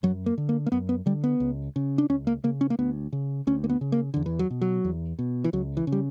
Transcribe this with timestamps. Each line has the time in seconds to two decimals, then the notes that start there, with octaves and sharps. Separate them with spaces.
0.03 F#2 F#3
0.26 A#3
0.38 D3
0.49 A#3
0.66 A#3
0.72 F#2 B3
0.89 B3
1.06 D3 G3
1.24 B3
1.40 C#2
1.76 C#3
1.98 D4
2.10 C#2 C#4
2.27 A#3
2.44 C#3 A#3
2.61 C#4
2.70 A#3
2.79 D2 B3
3.13 C#3
3.47 D2 C#4
3.64 A#3
3.69 B3
3.81 C#3
3.92 A#3
4.14 E2 D3
4.26 E3
4.39 F#3
4.50 B2
4.61 F#3
4.85 E2
5.19 B2
5.44 E3
5.53 C#2 F#3
5.77 E3
5.87 C#3
5.92 G3